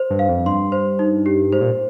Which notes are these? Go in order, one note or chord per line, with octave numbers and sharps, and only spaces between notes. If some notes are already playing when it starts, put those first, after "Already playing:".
Already playing: C5
G2
F5
F2
G2 C6
C5
D#4
G4
G#2 C5
A#2